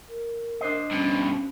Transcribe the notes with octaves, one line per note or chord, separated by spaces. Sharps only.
A#4
D4 C5 D#5
G2 B2 C#4